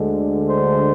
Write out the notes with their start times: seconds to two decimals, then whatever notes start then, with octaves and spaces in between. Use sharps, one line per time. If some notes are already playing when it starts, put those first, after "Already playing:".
Already playing: D2 D3 G#3
0.50 C5